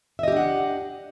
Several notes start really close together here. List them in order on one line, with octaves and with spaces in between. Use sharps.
E5 D#5 G4 D4 F#5